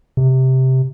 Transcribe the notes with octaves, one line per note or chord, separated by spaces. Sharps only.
C3